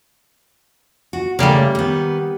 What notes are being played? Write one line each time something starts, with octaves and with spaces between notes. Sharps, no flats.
F#4
C#3 G3 A3 A#3
D#3 B3